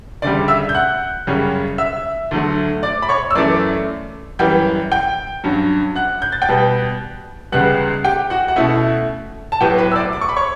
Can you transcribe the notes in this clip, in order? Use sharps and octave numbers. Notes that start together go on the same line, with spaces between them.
D2 C#3 G3 D5 D6
E5 E6
G6
F#5 F#6
F#2 C#3 G3 C#4
E5 E6
D2 D3 F#3 A3
D5 D6
B5
C#5 C#6
E6
F#2 E3 A3 C#4 D5 D6
F#2 E3 G3 G5 G6
G5 G6
G2 F#3 C#4
F#5 F#6
G6
A6
G5 G6
B2 G3 B3
C#2 C#3 G3 B3 F#5 F#6
G4 G5
F#4 F#5
F#5
B2 A3 C#4 E4 E5
A5
A2 F#3 B3 G4 G5
B4 B5
E6
D5 D6
D6
C#6
B5
C#5 C#6